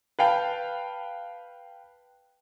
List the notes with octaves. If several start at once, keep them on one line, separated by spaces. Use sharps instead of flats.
B4 F5 G5 A5